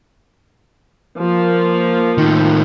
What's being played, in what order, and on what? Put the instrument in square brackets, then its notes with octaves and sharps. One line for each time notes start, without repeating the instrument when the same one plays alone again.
[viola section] F3 A#3
[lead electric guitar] A2 D#3